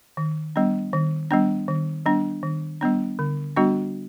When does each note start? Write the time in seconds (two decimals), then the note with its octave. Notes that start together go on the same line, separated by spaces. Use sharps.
0.17 D#3
0.56 G3 B3 D4
0.93 D#3
1.31 G3 B3 D4
1.68 D#3
2.06 G3 B3 D4
2.43 D#3
2.81 G3 B3 D4
3.19 D3
3.56 G3 B3 D4 F#4